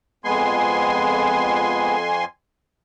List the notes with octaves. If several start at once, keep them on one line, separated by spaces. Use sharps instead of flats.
F2 G#3 B3 G#5 C6